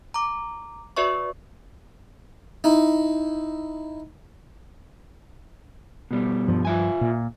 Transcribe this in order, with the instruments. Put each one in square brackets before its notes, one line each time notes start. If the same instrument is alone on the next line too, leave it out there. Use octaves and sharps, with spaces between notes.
[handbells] A#5 D6
F#4 B4 D5 E5 C#6
[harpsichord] D#4 E4
[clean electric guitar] B2 G3
[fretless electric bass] G2 F3
[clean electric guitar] F4 E5 G#5
[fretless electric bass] A#2